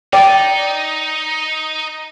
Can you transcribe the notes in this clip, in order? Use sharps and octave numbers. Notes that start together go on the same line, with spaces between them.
D#4 D5 G5